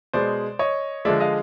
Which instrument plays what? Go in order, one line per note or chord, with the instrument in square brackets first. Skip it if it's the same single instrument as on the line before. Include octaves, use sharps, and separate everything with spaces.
[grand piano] B2 G#3 C5 D5
C#5 D#5
D3 F3 G#3 D5 E5
D#5 F5